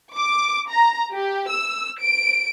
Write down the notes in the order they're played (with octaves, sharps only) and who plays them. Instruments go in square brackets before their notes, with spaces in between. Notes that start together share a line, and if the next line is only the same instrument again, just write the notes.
[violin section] D6
A#5
G4
E6
D7